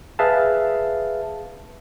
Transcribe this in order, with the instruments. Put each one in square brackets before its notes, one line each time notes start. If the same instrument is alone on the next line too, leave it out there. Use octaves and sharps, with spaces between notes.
[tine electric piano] G#4 B4 E5 F5 A5